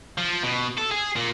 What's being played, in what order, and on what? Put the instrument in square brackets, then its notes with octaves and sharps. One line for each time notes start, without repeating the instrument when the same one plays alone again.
[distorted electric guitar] F3
B2
A4
G#4
A#2